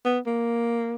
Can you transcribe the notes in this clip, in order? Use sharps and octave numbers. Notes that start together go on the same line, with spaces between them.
B3
A#3